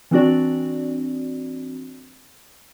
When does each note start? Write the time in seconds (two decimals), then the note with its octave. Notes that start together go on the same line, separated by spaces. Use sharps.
0.11 E3 C4 D4 F#4 D5